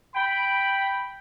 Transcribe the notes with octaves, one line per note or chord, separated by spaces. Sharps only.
G5 B5